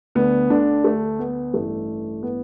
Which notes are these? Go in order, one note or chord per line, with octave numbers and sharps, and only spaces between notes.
D2 D3 B3
D3 D4
A3
B3
A1 G2 E3 A3
B3